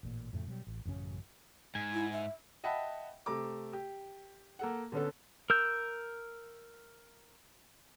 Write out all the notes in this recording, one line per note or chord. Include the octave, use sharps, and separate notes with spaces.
A1 A#2
F2 A2 C#3 A3
B2 F#3 G3
A1
A1 F#2 C#3 C#4
G#2 G#5
E4
E5
D#5 E5 F#5 G5 A5 B5
C3 A3 A#5 D6
G4
A#3 A4 F#5
D3 B3 C#4 A4
A#4 E6 G6